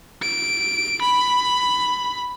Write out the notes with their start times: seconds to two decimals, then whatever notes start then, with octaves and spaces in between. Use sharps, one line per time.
0.22 D7
1.01 B5